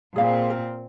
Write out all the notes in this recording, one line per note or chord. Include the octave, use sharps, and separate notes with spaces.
A#2 C4 G#4 F5
A#4